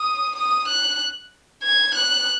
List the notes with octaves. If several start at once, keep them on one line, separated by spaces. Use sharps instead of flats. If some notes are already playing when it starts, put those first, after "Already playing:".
Already playing: D#6
D#6
F#6
G#6
F#6